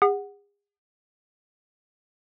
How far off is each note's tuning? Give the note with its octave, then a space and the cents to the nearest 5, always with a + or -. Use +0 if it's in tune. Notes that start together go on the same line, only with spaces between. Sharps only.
G#4 -40 F#5 +0